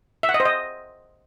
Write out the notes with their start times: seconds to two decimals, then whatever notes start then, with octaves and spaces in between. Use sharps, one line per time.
0.23 E5
0.29 F#5
0.34 D#5
0.40 C5
0.45 D#5